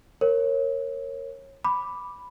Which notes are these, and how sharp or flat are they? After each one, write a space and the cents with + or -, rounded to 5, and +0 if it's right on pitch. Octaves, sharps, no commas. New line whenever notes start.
A#4 +0 C#5 -25
B5 +0 D6 +0